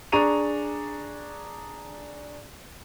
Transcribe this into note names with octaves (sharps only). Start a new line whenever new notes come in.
D4 G#4 A#5 C#6 D#7 F7